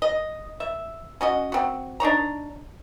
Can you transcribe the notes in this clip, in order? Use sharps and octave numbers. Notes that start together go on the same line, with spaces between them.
D#5
E5
C#4 F#4 D#5
C4 F#4
D4 D#4 C#5 A#5